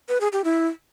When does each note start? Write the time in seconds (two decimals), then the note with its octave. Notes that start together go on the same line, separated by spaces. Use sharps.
0.09 B4
0.21 G#4
0.32 G4
0.44 E4